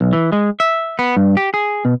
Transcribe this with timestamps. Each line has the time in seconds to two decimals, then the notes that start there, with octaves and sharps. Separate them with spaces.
0.01 B1
0.13 E3
0.32 G#3
0.60 E5
0.99 B3
1.17 G2
1.37 G4
1.54 G#4
1.85 B2